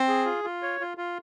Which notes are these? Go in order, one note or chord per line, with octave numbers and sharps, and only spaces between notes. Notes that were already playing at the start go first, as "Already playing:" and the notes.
Already playing: C4
G#4
F4
F4
C#5
F4
F4